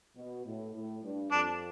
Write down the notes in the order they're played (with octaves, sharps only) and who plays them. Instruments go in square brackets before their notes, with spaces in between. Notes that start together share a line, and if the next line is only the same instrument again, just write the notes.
[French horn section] B2
A2
A2
G2
[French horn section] F2 [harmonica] D4